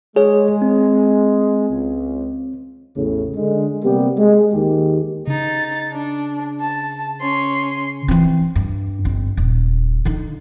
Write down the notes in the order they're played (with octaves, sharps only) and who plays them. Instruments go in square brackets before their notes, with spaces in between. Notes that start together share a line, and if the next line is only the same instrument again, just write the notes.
[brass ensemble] G#3 [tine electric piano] G#4 C#5
[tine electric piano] C4
[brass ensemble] C#2
[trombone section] A1 E2 A2 C#3
D3 G#3
C3 G3 A#3 B3 G4
G#3
D#2 D#3 G#3 G4
[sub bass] C#3 [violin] D#4 A6
[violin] D4
A5
C#4 C6
[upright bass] E3 C4
G2
G1 C4
D#1
D3 D#4